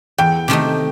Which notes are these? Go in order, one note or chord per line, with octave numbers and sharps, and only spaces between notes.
E2 G5
C3 D#3 A3 D#4